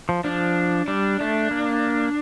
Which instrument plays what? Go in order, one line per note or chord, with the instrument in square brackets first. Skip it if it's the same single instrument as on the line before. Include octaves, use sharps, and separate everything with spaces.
[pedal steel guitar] F3
[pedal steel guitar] F3 [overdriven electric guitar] D4
[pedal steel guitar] G3 [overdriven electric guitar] D4
[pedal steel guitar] A3 [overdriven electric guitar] D4
[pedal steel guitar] A#3